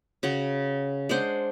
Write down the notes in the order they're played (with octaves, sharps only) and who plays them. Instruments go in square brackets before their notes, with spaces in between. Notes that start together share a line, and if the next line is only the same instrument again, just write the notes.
[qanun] C#3 F#4 F#5
G#3 D4 C5 F#5